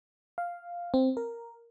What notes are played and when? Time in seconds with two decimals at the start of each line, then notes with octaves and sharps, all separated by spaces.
0.38 F5
0.94 C4
1.17 A#4